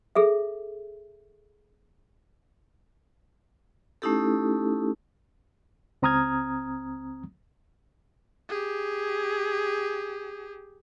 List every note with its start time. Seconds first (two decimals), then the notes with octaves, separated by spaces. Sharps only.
0.15 G#4 A4 E5
4.02 A3 C#4 D#4 E4 G4 A4
6.02 C#2 C4 A#5 D#6 F6 G#6
8.49 G4 G#4